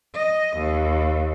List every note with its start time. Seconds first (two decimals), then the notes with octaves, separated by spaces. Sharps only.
0.14 D#5
0.57 D#2